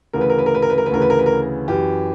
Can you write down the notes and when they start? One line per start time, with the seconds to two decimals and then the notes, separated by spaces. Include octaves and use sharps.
0.13 D2 C#3 E3 A#4
0.21 B4
0.30 A#4
0.38 B4
0.46 A#4
0.55 B4
0.62 A#4
0.70 B4
0.78 A#4
0.86 B4
0.91 D2 C#3 E3 A#4
1.02 B4
1.10 A#4
1.19 B4
1.26 A#4
1.68 F#2 E3 G4